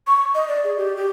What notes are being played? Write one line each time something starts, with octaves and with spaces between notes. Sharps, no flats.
C#6
D#5
D5
G#4
G4
G4